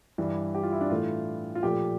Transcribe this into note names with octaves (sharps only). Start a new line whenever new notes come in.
G2 E3 G3
G4
F4
E4
D4
A2 E3 A3 F4
F4
A#2 F3 A3 G4